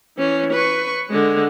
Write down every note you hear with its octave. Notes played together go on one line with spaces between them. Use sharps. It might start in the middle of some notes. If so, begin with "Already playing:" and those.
E3 C#4
B4 C#6
D3 G#3